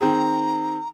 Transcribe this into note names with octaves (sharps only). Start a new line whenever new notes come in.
D#3 C4 G#4 A#5